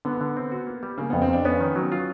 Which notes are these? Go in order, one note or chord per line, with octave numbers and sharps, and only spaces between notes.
D3 B3
D3
C4
F#4
A#3
G3
C#3 A#3
F2 B3
C4
F2 D4
B3 C#4
D#3
F#3
F4